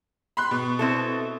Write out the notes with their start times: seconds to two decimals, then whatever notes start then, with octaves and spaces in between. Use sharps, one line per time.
0.37 B5 C6 F#6
0.51 B2
0.79 C4 E4 A4